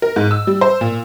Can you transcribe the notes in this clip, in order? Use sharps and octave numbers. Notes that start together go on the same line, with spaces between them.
A#4
G#2
E6
G3
C5
A#2